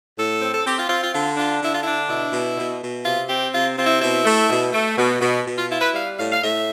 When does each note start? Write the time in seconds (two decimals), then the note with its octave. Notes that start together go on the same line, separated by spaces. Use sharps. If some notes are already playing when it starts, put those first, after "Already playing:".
0.17 A2 A4
0.41 C4
0.54 A4
0.66 C4 G4
0.78 F4
0.89 C4 F4
1.02 F4
1.13 D3 F4
1.37 D4 F4
1.62 D3 E4
1.72 F4
1.82 D4 E4
2.09 B2 E4
2.33 B2
2.57 B2
2.82 B2
3.05 C3 F4
3.29 C4 G4
3.54 C3 F4
3.78 C4 F4
3.85 E4
4.01 B2 E4
4.25 A3
4.50 B2
4.73 A3
4.97 B2
5.21 B2
5.45 B2
5.57 F4
5.70 E4 F4
5.81 B4
5.93 G3 F5
6.17 A2 F5
6.32 F5
6.42 A2 E5